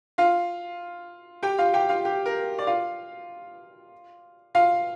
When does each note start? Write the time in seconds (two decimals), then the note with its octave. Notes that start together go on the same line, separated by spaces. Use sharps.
0.18 F4 F5
1.43 G4 G5
1.58 F4 F5
1.73 G4 G5
1.89 F4 F5
2.05 G4
2.26 A#4
2.59 D5
2.67 F4 F5
4.55 F4 F5